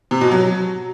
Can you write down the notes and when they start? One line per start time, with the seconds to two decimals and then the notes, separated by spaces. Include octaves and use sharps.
0.11 C3
0.21 B2
0.31 F#3